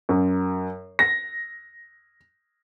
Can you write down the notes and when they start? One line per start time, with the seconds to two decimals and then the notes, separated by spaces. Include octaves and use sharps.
0.09 F#2
0.99 A#6